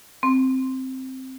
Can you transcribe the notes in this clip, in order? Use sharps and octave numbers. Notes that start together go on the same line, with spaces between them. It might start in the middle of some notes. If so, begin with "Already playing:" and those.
C4